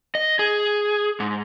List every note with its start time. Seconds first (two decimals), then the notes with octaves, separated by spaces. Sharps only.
0.15 D#5
0.39 G#4
1.20 G#2